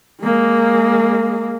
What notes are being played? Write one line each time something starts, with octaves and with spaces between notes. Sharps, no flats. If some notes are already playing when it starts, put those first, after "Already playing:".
G#3 A#3